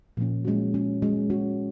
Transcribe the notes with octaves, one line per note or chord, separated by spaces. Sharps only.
A#2 F3 A#3 C#4
G#3 C#4 F#4
G#3 C#4 F#4
G#3 C#4 F#4
G#3 C#4 F#4